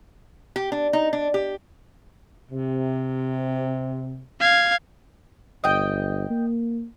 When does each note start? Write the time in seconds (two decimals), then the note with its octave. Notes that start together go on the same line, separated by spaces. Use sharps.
0.56 G4
0.72 D4
0.93 D#4
1.13 D4
1.34 G4
2.50 C3
4.40 F5 G#6
5.64 G1 D#5 G5
6.30 A#3